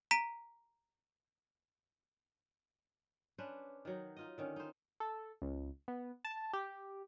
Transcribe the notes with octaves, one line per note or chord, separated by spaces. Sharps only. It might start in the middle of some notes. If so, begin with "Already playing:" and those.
A#5 B6 D7 D#7
C#4 D4 B4 C5
D#3 F#3 D#4
D#4 F4 D#5
D3 D#3 C#4
D#4 C5
A4
C#2
B3
A5
G4